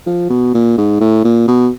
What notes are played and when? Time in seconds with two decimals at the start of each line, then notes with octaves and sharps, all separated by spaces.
0.06 F3
0.30 B2
0.54 A#2
0.78 G#2
1.00 A2
1.25 A#2
1.48 B2